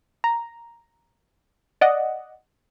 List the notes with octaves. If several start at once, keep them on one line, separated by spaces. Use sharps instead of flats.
A#5
D5 D#5 F#5